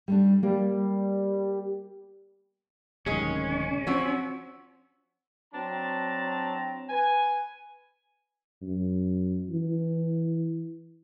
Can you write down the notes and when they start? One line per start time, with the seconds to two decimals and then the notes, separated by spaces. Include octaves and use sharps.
0.08 G3 A3 D4
0.43 G3 A#3
3.06 D1 C3 D#3 G#3 C#4 G#4
3.87 F3 C4 F#4 C#5
5.54 F#3 C4 D4 A5 A#5
6.89 B4 G#5
8.62 F#2
9.50 E3